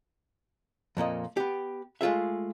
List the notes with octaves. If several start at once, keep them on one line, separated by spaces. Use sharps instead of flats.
F2 A#2 A#3 D#5
B3 G4
G#3 A3 F4 G#4 E5